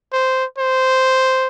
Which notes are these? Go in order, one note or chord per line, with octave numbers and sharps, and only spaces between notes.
C5
C5